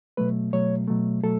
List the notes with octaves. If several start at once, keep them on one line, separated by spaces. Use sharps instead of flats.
B2 F#3 A3 B4
B2 F#3 A3 C#5
B2 F#3 A3
B2 F#3 A3 A4